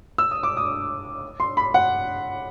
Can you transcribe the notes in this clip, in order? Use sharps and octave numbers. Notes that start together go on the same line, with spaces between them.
E6
D#6
D6
D#6
C6
B5
F#5